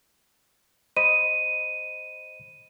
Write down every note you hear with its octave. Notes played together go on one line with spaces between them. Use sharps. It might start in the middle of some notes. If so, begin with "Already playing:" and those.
C5 D#5 B5 D#7